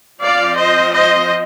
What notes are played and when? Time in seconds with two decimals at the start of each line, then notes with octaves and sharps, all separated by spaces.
0.20 F3 C4 D5 F5
0.56 C5 D#5
0.92 C5 D#5